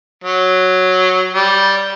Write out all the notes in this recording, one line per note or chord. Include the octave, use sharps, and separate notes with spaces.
F#3
G3